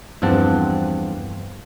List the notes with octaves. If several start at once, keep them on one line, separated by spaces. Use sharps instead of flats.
E2 G2 F3 C4 F#5 A5